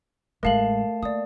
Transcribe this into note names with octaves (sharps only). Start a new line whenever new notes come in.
A1 G#3 A3 A#4 F5 A5 C7 F#7
A#3 D5 D#6